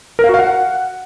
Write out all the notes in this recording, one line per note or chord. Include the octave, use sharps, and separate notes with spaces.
A#4
F5
F#4
F5
F#5